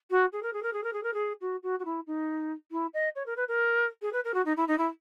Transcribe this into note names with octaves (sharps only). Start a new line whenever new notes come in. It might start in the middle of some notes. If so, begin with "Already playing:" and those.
F#4
G#4
A#4
G#4
A#4
G#4
A#4
G#4
A#4
G#4
F#4
F#4
F#4
E4
D#4
E4
D#5
C#5
A#4
B4
A#4
G#4
B4
A#4
F#4
D#4
E4
D#4
E4